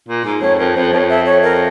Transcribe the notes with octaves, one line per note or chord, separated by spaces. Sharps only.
A#2
G#2
F2 C#5
F2 A#4
F2 C5
F2 C#5
E5
C#5
A#4